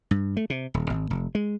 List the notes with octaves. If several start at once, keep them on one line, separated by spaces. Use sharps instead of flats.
G2
A3
C3
D#1
G#1
F1
G#3